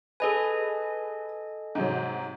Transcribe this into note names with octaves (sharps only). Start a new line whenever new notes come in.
G#4 A4 B4 D#5 G#5
G#2 C3 F#3